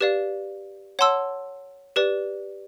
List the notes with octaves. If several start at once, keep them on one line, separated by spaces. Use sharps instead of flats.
G4 B4 D5 F5
C#5 F#5 A5 C6 E6
G4 B4 D5